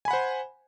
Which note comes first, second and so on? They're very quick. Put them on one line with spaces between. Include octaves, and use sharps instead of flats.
G#5 B5 F#5 C5